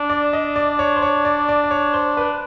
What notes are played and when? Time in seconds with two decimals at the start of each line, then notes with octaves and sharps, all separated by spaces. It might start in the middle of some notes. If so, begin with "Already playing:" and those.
Already playing: D4
0.10 D5
0.33 D#5
0.56 D5
0.79 C#5
0.96 C5
1.02 C#5
1.25 D5
1.49 D5
1.64 D5
1.71 C#5
1.94 C5
2.17 B4